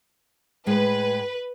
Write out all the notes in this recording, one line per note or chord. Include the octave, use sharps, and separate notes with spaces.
A2 G#3 B4